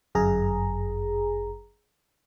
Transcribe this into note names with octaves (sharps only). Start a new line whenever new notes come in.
G1 F#2 G#4 A#5